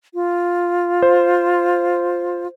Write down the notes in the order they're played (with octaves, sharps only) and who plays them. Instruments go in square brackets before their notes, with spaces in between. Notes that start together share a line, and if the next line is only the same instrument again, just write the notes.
[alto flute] F4
[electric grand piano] C5